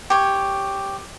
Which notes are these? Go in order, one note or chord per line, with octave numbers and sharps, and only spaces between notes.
G4 C#5